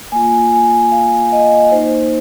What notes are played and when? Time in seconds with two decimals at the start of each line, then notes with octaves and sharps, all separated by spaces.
0.12 A#3 F4 G#5
0.52 G#5
0.92 F5
1.32 D#5
1.72 A#3 D#4 C5